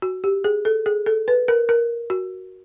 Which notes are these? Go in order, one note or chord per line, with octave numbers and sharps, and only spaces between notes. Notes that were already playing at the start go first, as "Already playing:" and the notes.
F#4
G4
G#4
A4
G#4
A4
B4
A#4
A#4
F#4